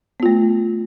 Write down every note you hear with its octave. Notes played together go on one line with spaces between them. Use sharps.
A3 B3 F4